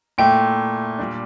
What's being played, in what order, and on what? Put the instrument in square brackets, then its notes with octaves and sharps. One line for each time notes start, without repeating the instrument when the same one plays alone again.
[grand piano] A#2 A3 E4 [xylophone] G5
[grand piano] A#2 G3 D4